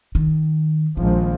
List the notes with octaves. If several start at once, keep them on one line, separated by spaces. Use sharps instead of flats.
D#3
A#1 D#3 F3 G#3